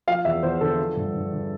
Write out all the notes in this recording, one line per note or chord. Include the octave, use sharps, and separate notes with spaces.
F3 F5
E2 E5
E2 C5
D3 A4
F3
G2
G2
D3